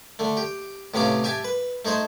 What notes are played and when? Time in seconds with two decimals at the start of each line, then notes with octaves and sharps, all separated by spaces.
0.19 D3 A3
0.37 G4
0.94 A2 C3 B3 C#4 F5 D6
1.24 G4 E5 G#5 A5
1.44 B4
1.85 A3 D#4 G#4 C5